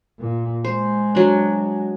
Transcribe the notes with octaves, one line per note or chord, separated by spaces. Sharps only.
A#2
G#3 C5
F#3 D4